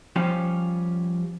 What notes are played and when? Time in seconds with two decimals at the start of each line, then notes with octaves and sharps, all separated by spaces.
0.16 F3 G3 C#4 G4